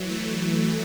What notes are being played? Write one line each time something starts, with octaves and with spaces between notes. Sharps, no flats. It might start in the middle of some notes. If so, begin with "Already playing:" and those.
Already playing: E3 F#3
A3